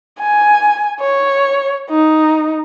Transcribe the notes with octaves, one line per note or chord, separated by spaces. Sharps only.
G#5
C#5
D#4